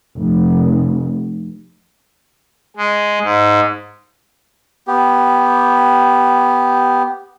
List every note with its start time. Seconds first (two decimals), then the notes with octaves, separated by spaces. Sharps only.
0.16 F1
2.77 G#3
3.23 G#2
4.87 B3 G4